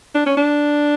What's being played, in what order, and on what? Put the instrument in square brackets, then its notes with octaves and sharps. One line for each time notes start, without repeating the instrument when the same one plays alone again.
[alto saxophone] D4
C#4
D4